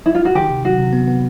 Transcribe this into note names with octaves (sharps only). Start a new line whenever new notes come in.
E4
F4
F#4
D#3 G4
C3
F#3 F#4
C3
B3
B3